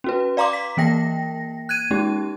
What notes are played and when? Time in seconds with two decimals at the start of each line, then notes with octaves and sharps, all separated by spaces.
0.04 C#4 F#4 B4
0.37 D5 F5 A#5 C6 D6
0.53 B6
0.77 E3 A#3 G5 A#6
1.69 F#6 G#6 D#7
1.91 G#3 C#4 D#4 G4